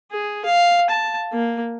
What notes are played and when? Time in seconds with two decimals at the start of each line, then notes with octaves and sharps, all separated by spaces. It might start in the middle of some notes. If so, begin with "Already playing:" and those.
0.12 G#4
0.45 F5
0.90 A5
1.33 A#3